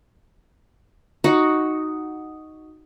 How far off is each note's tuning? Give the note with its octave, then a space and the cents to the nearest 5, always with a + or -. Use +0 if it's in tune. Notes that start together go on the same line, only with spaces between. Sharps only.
D#4 +0 F#4 +0